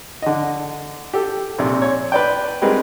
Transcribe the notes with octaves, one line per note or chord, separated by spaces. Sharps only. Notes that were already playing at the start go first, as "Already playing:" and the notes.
D3 D#5
G4 A4
A#1 C3
C#5
B4 D5 G5
G3 G#3 C4 A#4 B4